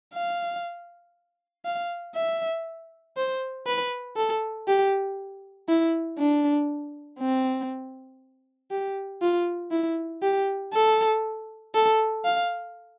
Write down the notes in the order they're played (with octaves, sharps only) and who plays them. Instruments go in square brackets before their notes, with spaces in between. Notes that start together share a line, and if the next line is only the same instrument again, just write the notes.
[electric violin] F5
F5
E5
C5
B4
A4
G4
E4
D4
C4
G4
F4
E4
G4
A4
A4
F5